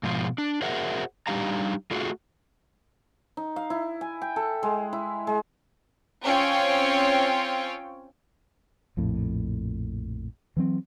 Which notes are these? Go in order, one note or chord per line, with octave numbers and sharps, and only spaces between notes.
G#2 B2 F3 F4
D4
F#4 G#4 A#4 C5 E5 F#5
G3 D4 D#4 G4 F5 A#5
A3 F4 F#4 G#4
D#4
F5
E4
G#5
G5
A4
G#3
E4
G#3
C4 C#4 F4 C#5 G5
A#1 F2 A2
E3 F#3 C4